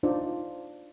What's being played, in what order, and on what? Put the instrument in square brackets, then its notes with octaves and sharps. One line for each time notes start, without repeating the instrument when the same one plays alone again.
[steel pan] D4 D#4 F4 C5 D5